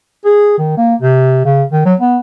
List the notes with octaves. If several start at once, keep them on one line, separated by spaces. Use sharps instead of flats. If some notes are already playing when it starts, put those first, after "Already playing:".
G#4
D#3
A#3
C3
C#3
D#3
F#3
B3